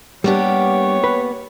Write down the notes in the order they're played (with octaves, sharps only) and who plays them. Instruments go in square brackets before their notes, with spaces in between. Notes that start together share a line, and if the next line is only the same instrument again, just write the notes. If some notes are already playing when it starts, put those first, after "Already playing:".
[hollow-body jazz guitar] G3 D4 [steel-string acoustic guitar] A#3 B3 G4 [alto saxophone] C#5
[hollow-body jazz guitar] B4